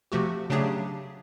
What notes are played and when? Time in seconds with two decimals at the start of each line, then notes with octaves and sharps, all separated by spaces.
0.12 C3 F3 A3 F#4 G4
0.50 C#3 F#3 A3 D4 G4 G#4